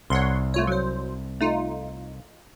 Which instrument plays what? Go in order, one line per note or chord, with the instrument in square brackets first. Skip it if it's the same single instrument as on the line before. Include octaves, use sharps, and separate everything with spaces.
[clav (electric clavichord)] C2 [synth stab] C#5 F#5 C6
[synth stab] A3 F4 C#5
F#3 C5
A3 D#4 F4